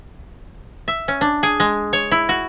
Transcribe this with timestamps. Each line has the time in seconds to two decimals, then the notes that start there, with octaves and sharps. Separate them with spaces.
0.88 E5
1.08 C#4
1.21 D4
1.43 G#4
1.60 G#3
1.93 C#5
2.12 E4
2.29 F#4